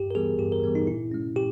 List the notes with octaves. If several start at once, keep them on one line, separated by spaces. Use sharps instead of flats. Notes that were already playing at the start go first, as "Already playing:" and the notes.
Already playing: G2 G4
A#4
E3 G3 B3 G#4
G2 G4
A#4
E3 G3 B3
D#4
A#2 E4
G#3 C#4
A#2 G4